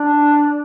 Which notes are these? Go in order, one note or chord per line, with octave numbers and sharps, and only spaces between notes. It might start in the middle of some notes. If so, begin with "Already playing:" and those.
Already playing: D4